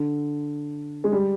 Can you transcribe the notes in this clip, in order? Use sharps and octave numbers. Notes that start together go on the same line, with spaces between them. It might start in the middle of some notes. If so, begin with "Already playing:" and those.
Already playing: D3
G#3
G3